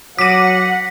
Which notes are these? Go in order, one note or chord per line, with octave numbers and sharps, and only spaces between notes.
F#3 F#5 D6 A#6 B6 D#7